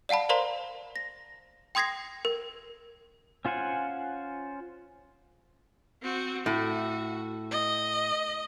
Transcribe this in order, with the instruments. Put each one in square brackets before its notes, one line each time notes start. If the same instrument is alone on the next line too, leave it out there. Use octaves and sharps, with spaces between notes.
[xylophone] D5 F5 F#5 A5 B5
A#4 C5 D5 F5 A#5 C6
A#6
G5 C6 D#6 G#6 A#6 C7
A#4
[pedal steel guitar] C#4 F4 C5 F#5 G#5
[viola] C4 F#4
[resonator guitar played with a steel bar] A2 [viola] F#4
[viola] D#5